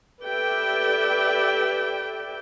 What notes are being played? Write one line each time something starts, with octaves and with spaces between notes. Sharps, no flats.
G4 A4 B4 D5 E5 G5